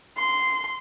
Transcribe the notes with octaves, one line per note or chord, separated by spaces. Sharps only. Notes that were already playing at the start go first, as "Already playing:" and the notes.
C6